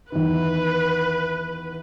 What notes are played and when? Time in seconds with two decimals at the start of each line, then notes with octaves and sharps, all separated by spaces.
0.12 E2 D#3 B4